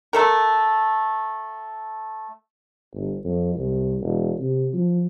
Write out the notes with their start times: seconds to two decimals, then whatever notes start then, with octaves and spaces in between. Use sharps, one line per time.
0.13 A3 A4 A#4
2.94 G1
3.25 F2
3.55 C2
4.00 E1
4.39 C3
4.74 F3